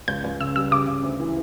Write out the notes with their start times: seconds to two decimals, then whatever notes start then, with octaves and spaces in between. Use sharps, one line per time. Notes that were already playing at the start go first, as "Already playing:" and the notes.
0.08 C#2 G6
0.24 C#2
0.40 C#3 E6
0.56 G3 E6
0.71 C#3 D6
0.87 C#3
1.03 D2
1.20 E3